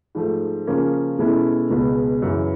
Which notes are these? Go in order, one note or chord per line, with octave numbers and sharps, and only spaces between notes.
G#2 F3 A3
C#3 F3 A#3 C#4
B2 G#3 C#4 E4 A4
C#2 B2 G#3
F#2 C#3 E3